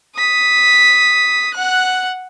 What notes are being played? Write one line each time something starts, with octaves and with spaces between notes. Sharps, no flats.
D#6 B6
F#5 F#6